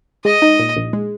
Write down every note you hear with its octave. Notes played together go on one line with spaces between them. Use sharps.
G#3 D#5
D#4
A#2
A#1
G#3